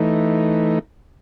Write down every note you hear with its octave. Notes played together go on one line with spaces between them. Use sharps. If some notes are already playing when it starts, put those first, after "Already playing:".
Already playing: E3 A3 D#4